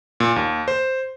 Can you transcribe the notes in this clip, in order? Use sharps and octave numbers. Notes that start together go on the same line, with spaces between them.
A#2
D#2
C5